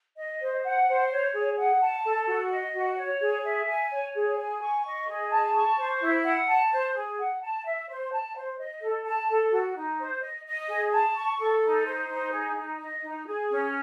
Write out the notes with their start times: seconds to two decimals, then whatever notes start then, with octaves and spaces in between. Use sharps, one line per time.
0.17 D#5
0.41 C5
0.64 F#5
0.88 C5
1.10 C#5
1.34 G#4
1.58 F#5
1.81 A5
2.04 A4
2.27 F#4
2.51 D#5
2.74 F#4
2.97 C#5
3.21 G#4
3.45 E5
3.67 G#5
3.91 C#5
4.15 G#4
4.38 G#5
4.61 C#6
4.85 D#5
5.08 G#4
5.31 A5
5.55 C#6
5.78 C5
6.01 E4
6.24 F#5
6.48 A5
6.72 C5
6.95 G#4
7.19 F#5
7.41 A5
7.65 E5
7.88 C5
8.12 A5
8.35 C5
8.59 D#5
8.82 A4
9.05 A5
9.29 A4
9.51 F#4
9.76 D#4
9.99 C5
10.22 D#5
10.45 D#5
10.68 G#4
10.92 A5
11.16 C#6
11.39 A4
11.63 D#4
11.86 C5
12.09 D#4
12.32 G#4
12.56 D#4
12.79 D#5
13.03 D#4
13.26 G#4
13.49 C#4